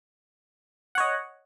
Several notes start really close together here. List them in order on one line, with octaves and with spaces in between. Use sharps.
F#5 C#5 D#5